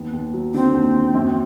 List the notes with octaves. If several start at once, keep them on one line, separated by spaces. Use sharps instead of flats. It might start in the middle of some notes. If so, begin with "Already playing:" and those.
Already playing: D#2 B3
D#2
F#3
D3 C4
D#2
D#2
F#2